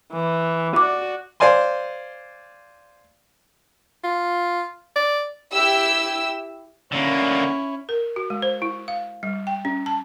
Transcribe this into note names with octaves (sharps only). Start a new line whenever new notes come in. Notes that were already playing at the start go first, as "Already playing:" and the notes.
E3
F#4 D5 D6
C5 D5 F5 G#5 C6
F4
D5
E4 G4 E6
D3 A#3 C#4 E4
A#4
F#4
G#3
C5
E4
F5
G3
G5
C#4
A5